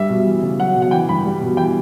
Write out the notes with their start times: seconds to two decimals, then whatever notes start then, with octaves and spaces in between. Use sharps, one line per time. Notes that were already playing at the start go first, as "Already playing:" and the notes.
Already playing: G2 G3 E5
0.10 B2
0.26 E3
0.42 C#3
0.59 F#3 F#5
0.75 B2
0.82 F#5
0.91 E3 G5
1.08 G2 B5
1.25 G3
1.41 B2
1.57 E3 G5